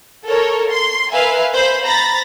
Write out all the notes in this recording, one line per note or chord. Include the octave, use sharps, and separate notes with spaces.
A4 A#4 C#5
C6
A#4 B4 E5 F5 G#5
C5 B5
A#5 B5 A6 A#6